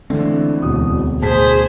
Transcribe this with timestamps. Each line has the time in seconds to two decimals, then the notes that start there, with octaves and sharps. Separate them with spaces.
0.10 D3 E3 A3 C4
0.62 E1 D2 B2 D#6
1.22 A2 G#4 C5 A5 B6